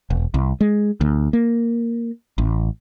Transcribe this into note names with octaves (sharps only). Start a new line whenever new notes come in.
E1
C2
G#3
D2
A#3
A1